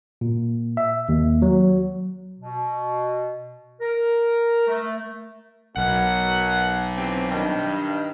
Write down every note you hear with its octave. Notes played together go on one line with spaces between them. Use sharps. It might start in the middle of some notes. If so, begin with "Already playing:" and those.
A#2
E5
D#2
F#3
B2
A#4
A3
B1 B2 A#4 F#5
C3 E3 C4
G2 D#3